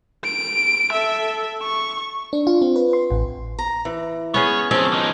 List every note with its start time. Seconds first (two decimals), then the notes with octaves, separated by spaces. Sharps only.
0.24 D7
0.92 A4 E5
1.62 C#6
2.33 D4
2.47 F4
2.62 C4
2.76 B4
2.93 C6
3.11 A1
3.59 A#5
3.85 E3
4.34 B3 C#4 G#4 C#5
4.71 E2 F3 C4 C#4 G#5
4.92 D3 D#4